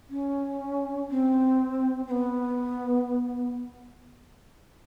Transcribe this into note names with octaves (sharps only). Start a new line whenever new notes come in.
C#4
C4
C4
B3